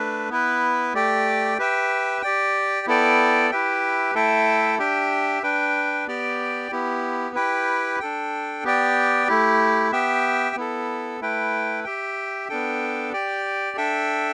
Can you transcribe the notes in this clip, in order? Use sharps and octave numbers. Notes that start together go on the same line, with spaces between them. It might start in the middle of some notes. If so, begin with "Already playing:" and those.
Already playing: A3 D4 B4
B3 E4 B4
A3 G4 D5 G5
G4 B4 E5 G5
G4 D5 G5
B3 E4 A4 D5 G5
E4 G4 B4 E5 G5
A3 E4 A4 E5 G5
D4 G4 E5 G5
D4 B4 G5
B3 G4 D5 G5
B3 E4 G4
E4 G4 B4 G5
D4 A4 G5
B3 G4 D5 G5
A3 E4 G4
B3 G4 E5 G5
B3 E4 A4
A3 E4 B4 G5
G4 E5 G5
B3 D4 A4 G5
G4 D5 G5
D4 A4 E5 G5